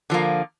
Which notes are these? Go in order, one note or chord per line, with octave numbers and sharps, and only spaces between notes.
D3 F3 A#3